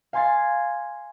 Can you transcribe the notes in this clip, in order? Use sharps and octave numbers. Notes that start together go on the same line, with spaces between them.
F5 G#5 C6 G#6 A6 C7